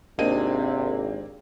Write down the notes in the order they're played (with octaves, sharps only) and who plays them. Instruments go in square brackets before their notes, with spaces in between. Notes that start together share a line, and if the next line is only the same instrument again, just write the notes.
[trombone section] G#1 [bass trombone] C3 [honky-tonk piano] A#3 C4 [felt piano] D4 D#5 D#7